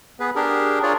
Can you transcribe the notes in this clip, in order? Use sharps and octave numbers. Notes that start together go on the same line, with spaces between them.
B3 G#4 B4
D4 G4 G#4 A#4
D4 F4 G#4 A#4 C#5 D5